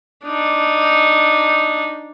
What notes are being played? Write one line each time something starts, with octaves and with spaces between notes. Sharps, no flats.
D4 D#4